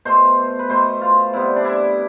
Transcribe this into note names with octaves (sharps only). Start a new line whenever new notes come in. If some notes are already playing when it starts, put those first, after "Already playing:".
B2 A3 C5
B4
B2 A3 C5
F4
C3 G3 B3 E4
D4
E4